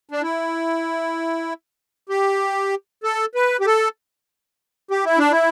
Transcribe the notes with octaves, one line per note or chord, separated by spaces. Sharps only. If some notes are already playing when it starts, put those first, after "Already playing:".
D4
E4
G4
A4
B4
G4
A4
G4
E4
D4
E4